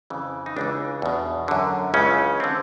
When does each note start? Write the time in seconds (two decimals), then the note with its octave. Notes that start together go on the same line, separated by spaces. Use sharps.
0.10 F2 C#3 E3
0.46 D#4
0.56 C#2 C#3 E3 D4
1.02 E2 B2
1.48 F#2 D3
1.94 C#2 C#3 E3 C#4
2.40 D3 C4